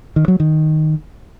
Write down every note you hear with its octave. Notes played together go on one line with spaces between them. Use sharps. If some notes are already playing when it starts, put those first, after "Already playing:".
D#3
F#3
D#3